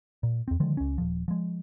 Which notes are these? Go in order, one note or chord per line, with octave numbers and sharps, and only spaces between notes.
A#2
E2 C4
D3 D#3 F3 G#3
C#2 C#4
D#1 F3
F3 G#3